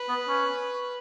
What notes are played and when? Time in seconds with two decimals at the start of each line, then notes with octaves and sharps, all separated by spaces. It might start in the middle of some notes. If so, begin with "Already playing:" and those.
Already playing: B4
0.09 B3
0.28 C#4